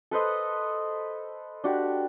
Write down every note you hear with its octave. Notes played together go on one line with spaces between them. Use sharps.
A4 B4 C5 D#5
D4 F#4 G4